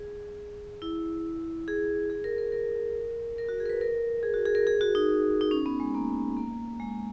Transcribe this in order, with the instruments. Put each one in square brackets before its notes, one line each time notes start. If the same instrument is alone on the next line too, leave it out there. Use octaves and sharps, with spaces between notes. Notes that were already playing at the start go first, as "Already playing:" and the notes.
Already playing: [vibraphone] G#4
E4
G#4
G#4
A#4
A#4
A#4
A#4
F#4
G#4
A#4
B4
A#4
G#4
F#4
G#4
A#4
G#4
F#4
D#4
D#4
C#4
B3
G#3
A#3
A#3
G#3